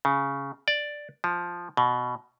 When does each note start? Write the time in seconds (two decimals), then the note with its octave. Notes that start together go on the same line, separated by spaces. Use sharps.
0.05 C#3
0.68 D5
1.24 F3
1.77 B2